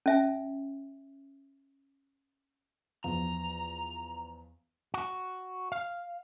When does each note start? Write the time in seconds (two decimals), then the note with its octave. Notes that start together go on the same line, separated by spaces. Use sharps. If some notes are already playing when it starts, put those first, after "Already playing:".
0.06 C#4 E5 G#5
3.04 E2 F3 A#5
4.94 F#4
5.72 F5